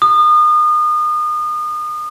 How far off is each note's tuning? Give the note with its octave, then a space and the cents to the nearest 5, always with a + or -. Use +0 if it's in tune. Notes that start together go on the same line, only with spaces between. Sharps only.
D#6 -35